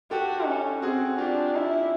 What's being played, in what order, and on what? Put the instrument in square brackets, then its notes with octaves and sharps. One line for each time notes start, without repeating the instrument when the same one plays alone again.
[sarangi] F#4 [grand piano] G4 A4
[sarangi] C#4
[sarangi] C4 [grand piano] F#4 G#4
[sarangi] D4 [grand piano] F4 G4
[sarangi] E4